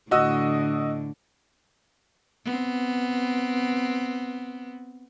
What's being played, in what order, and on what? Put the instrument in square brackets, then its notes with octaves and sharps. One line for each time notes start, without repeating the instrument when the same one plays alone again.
[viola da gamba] A2 D3 [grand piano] F#4 D#5 E6
[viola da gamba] B3 C4